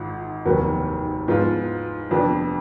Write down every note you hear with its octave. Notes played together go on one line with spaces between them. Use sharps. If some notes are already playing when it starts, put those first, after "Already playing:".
Already playing: G#1 G#2 F4
F1 D#2 D#3 F#3 B3
G#2 F3 B3 F4
F1 F2 F3 B3 D4